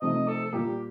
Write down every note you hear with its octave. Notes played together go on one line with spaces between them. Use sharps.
C3 F3 A3 D#4 D#5
A4
A4
A#2 G3 A#3 G4